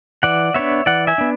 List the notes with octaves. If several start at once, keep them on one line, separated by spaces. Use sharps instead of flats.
E3 D5 F#5
B3 D4 C#5 E5
E3 D5 F#5
E5 G#5
B3 D4